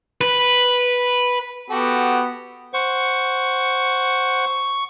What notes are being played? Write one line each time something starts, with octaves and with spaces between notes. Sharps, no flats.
B4
B3 F#4 G4 A4
C5 F#5 C#6